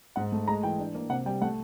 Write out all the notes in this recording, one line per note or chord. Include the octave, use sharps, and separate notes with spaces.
G#2 F#5
A3
G#3 A#5
E3 G5
D4
A#3
C3 F#5
G3 G5
A3 F#5